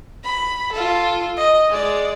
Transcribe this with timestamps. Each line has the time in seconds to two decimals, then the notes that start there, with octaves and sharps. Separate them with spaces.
0.24 B5
0.73 F4 A4
1.37 D#5
1.70 G#3 D5